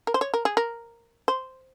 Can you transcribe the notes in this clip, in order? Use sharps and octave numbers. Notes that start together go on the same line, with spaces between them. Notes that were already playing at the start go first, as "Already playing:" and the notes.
A#4
C5
C#5
A#4
G#4
A#4
C5